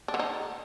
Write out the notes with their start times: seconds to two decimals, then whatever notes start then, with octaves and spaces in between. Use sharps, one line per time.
0.08 D4
0.14 D3
0.20 D#4